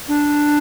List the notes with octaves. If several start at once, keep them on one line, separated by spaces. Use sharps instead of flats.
D4